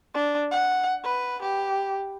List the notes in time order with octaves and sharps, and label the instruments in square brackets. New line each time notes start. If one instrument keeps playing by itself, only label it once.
[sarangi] D4
F#5
B4
G4